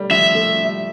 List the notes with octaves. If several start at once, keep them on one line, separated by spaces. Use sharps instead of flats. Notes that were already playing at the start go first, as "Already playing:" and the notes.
Already playing: G3 A3
F3 E5
A3
G3